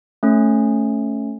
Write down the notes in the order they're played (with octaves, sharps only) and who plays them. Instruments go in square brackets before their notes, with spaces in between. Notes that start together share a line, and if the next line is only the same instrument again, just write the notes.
[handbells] A3 C#4